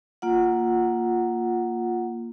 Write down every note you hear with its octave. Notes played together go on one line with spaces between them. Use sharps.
A#3 F4 F#5